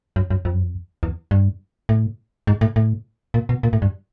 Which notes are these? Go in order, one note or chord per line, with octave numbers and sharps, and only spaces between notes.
F#2
F#2
F2
F#2
F2
E2
G2
A2
G#2
A2
A2
A#2
B2
A#2
A2
G2